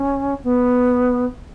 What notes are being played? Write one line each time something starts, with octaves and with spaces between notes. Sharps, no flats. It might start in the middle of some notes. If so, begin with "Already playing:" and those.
Already playing: C#4
B3